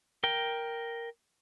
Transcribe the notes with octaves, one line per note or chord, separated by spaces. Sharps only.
A#4 G5